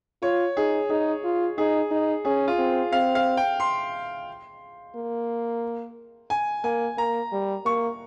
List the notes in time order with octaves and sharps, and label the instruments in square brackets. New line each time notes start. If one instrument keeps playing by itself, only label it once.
[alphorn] F4 [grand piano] C#5
[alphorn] D#4 [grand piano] G#4
[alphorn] D#4 [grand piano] G#4
[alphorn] F4
[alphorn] D#4 [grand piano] G#4
[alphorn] D#4
[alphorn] C#4 [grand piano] G#4
[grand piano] F4
[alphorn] C4
[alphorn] C4 [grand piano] F5
[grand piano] F5
G5
C6
[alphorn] A#3
[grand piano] G#5
[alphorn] A#3 [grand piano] G#5
[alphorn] A#3 [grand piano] A#5
[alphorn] G3
[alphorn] A#3 [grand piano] C#6